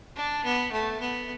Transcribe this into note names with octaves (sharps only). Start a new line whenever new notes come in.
D4
B3
A3
B3